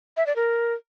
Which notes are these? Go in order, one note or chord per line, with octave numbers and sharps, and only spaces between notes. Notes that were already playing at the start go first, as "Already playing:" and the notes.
E5
D5
A#4